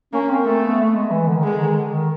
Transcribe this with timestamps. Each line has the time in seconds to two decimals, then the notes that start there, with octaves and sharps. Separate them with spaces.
0.13 A#3 C#4
0.30 C4
0.46 A3 C4
0.63 B3
0.79 A3
0.95 G#3
1.11 E3
1.27 D3
1.38 D#3
1.44 D3 G#3
1.60 D#3
1.77 D3
1.93 D#3